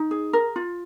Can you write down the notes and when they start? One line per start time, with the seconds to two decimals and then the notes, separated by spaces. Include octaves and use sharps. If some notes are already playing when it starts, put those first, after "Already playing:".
Already playing: D#4
0.11 G#4
0.33 A#4
0.56 F4